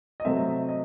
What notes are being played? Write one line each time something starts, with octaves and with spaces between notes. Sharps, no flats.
D#5
C3 F#3 A3 C4 E5
D#5